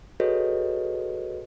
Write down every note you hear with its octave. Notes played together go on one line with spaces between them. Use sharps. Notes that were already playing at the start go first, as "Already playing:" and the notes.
F#4 G#4 A4 B4 C#5 D#5